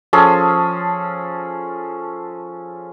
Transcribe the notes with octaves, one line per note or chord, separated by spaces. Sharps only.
F3 C#4 G#4 A4